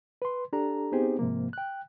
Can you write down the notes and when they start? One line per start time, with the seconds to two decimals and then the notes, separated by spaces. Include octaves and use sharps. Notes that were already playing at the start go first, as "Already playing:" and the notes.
0.22 B4 C6
0.53 D4 G4 A4 A#5
0.92 B3 C4 D#4 G4 G#4 C5
1.19 G#2 C3 F3 A#3
1.53 G5 F#6